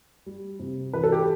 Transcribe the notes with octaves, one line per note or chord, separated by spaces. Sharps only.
G3
C3
E3 B4
A4
G4